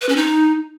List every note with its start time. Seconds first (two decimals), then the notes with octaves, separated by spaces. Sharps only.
0.01 B4
0.09 C#4
0.16 D#4